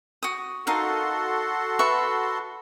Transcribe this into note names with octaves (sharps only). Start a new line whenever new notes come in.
F#4 D#6
D#4 F#4 A4 A#4 F5 C6
B4 E5 C#6